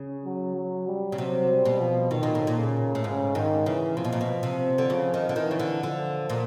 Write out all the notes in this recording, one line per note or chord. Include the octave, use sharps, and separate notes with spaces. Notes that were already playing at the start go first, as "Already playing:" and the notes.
Already playing: C#3
F#3
F#3
G3
C#3
C3 F#3
G3
B2
F3
B2 D#3
A#2
A2
A#2
C#3
A2
G#2 C#3
G#2 D#3
C#3 E3
C3 F3
B2
A#2
B2
C3
D3
C#3 F3
D#3
D3
D#3 E3
C#3
D3
D3 F3
A#2